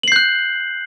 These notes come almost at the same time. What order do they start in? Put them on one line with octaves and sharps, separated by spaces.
F#7 C7 G6 F#6